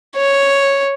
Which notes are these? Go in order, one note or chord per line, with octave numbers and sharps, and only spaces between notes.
C#5